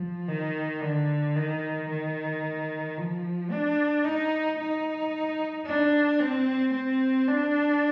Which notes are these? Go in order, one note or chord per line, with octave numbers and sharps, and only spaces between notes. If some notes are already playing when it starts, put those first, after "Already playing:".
Already playing: F3
D#3
D3
D#3
D#3
F3
D4
D#4
D#4
D4
C4
C4
D4